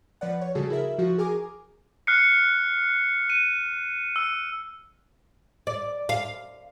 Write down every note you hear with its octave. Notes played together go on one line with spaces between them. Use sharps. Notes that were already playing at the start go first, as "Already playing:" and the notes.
F3 B4 D5 F#5
C#5
C#3 G3 F#4 G#4 A4
E4 A#4 E5
F3 F#4
G#4 A#4 G#5 D6
F6 F#6 C7 C#7
D#7
E6
D5
F5